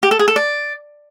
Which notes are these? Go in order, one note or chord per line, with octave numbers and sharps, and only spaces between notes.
G4
A4
G#4
A4
D5